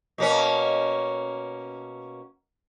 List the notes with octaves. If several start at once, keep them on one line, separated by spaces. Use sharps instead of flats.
B2 A#3 C#4